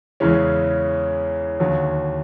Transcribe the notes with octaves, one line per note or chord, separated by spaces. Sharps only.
E2 C#3 E3 G#3 C#4
D#2 D3 F#3